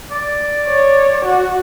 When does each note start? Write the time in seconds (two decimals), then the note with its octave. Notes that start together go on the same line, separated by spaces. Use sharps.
0.11 D5
0.68 C#5
1.25 F#4